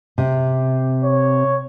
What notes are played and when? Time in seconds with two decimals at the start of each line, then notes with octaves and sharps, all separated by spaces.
0.18 C3
1.04 C#5